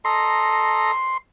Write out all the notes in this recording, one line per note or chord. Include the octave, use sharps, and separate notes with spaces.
A4 D#5 A#5 C6